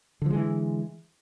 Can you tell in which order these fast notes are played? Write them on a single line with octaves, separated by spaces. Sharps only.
D3 F3 G#3 E3